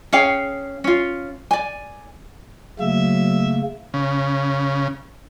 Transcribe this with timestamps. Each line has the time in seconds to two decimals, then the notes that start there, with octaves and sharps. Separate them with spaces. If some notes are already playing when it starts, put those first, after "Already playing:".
0.13 C#4 G#4 F5 G5
0.84 C#4 F4
1.51 D5 G#5
2.80 C#3 F#3 A3 A#3 E5
3.94 C#3